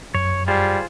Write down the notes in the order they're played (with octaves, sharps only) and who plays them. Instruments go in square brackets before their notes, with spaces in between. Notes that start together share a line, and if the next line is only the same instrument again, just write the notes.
[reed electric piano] F#2 [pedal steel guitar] C#5
[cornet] G3 [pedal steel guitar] F4 G#4 C5